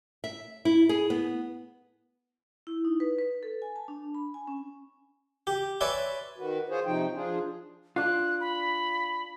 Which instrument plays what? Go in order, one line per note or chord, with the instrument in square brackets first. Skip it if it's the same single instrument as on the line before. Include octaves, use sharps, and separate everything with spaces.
[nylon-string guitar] E5
E4
G#4
B3
[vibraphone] E4
D#4
B4
B4
A4
G#5
A5
D4
B5
G#5
C#4
[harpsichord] G4
B4 C#5 D5 E5 G#5 C6
[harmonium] D#3 F#4 B4
F4 G#4 C5 C#5
C3 F3 D#4 G5
F3 D4 F4 G#4
[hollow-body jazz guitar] D4 F4 [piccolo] F#6
[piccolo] B5